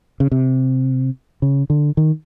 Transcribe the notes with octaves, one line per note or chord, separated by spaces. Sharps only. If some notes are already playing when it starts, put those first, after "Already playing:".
C#3
C3
C#3
D3
D#3